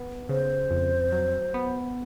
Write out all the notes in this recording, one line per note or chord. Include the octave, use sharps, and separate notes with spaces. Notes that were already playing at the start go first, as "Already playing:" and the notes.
Already playing: B3
C#3 C5
F2
F#3
B3